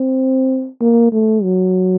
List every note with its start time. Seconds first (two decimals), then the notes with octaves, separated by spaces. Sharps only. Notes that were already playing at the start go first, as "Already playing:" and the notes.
Already playing: C4
0.80 A#3
1.12 A3
1.43 F#3